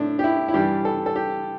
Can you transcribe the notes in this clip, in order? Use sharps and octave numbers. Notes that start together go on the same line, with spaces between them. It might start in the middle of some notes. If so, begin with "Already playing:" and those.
Already playing: A2 A3 D4
G4
E4
E4
G2 E3 G3 G4
A4
A4
G4